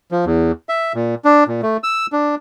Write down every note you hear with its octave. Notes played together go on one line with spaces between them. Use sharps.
F3
E2
E5
A#2
D4
A#2
A3
E6
D4